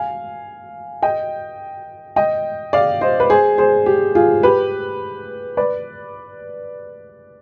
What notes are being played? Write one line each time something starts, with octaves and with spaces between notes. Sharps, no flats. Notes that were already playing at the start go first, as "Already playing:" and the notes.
Already playing: F5 G#5
D#5 G5
D#5 G5
D5 F5
C5 D#5
B4
G#4 C5
G#4 C5
G4
F4 G#4
G4 B4
B4 D5